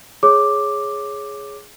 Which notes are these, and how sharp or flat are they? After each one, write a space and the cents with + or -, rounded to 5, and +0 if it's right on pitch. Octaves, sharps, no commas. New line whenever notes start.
G#4 +0 C#5 +0 D6 +5